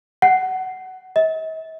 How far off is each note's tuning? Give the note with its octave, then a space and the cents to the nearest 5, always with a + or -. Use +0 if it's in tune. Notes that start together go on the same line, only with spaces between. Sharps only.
F#5 +15
D#5 +45